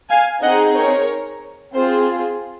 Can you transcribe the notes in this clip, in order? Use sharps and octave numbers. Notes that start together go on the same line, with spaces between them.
F5 G#5
C4 D#4 G#4 D#5 F#5
A#4 C#5
C4 F4 G#4 C5